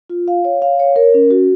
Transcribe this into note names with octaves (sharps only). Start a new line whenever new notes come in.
F4
F5
C#5
F5
C#5
A#4
C#4
F#4